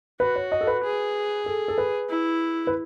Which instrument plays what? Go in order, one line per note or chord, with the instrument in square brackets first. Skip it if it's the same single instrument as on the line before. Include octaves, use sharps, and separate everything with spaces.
[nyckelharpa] F#4 [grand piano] B4
[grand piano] C#5
D#5
A4
B4
[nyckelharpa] G#4
[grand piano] A4
A4
B4
[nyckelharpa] E4
[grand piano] B4